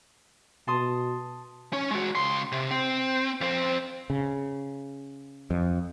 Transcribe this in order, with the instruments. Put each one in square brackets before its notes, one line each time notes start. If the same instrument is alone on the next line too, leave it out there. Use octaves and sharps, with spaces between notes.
[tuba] B2 [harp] A5 C6 D#6
[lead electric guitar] C#4 C#5
G#3 F#4
C#2 C6
C3
C4
F2 C4
[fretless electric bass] C#3
F2